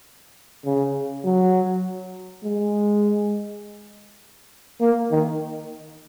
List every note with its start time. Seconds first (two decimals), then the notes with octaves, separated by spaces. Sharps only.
0.66 C#3
1.25 F#3
2.44 G#3
4.81 A#3
5.11 D#3